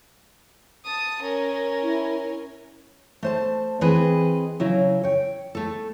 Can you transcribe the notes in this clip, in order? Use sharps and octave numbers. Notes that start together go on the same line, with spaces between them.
A5 D#6
C#4 A#4
E4
A3 C5 A5
E3 C4 G#4 B4 D#5
C#3 F#3 E4
C#5 G5
A3 A4